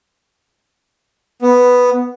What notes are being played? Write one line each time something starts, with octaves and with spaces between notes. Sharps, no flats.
B3